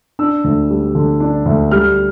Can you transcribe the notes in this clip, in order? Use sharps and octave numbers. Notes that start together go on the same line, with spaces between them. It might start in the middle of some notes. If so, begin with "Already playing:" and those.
D4 E6
D2
G3
D3
D4
D2
G3 F6